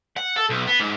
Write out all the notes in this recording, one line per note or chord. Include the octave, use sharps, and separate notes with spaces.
F#5
A4
B1
B3
G#2